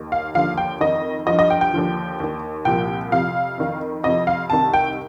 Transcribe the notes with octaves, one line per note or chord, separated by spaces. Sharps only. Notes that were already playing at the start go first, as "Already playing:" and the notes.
Already playing: D#2 D#3
F5
D#2 D3 F3 F5
G5
F2 D#3 D#5
G2 F3 D#5
D#5
G5
G5
D#2 D3 F3
D#2 D#3
C2 A#2 F3 G5
F2 C3 F3 F5
F2 D#3
F2 C3 F3 D#5
F5
C2 C3 D#3 A5
G5